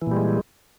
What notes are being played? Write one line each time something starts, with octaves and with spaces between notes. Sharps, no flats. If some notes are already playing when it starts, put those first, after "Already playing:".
A#2 E3 G3 G#3